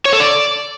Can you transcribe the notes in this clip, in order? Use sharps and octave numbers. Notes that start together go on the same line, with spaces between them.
C#5
A4
D5